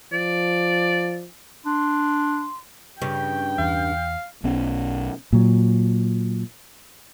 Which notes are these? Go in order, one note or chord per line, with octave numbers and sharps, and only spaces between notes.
F3 D5
D4 C6
G2 C#3 G5
E2 F5
B1 B3 C#4
A#2 F#3